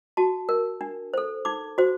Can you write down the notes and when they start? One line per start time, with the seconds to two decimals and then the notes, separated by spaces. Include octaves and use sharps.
0.17 F#4 A5
0.49 A#4
0.81 D4
1.14 A4 C5
1.45 D#4 D6
1.78 F#4 C5